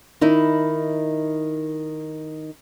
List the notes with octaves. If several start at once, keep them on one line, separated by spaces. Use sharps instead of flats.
D#3 D#4 E4